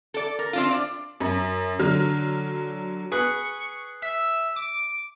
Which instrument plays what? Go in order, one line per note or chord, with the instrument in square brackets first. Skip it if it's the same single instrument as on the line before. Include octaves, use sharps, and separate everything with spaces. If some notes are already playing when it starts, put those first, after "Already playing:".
[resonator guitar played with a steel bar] A4 D5
A#4
C4 D4 F4
D5
[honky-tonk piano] F#2
D3 F#3 F6
[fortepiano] G#4 B4 F#6 [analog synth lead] C#6
[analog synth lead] E5
D6